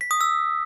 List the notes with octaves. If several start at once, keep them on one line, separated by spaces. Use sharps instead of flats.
B6
D#6
E6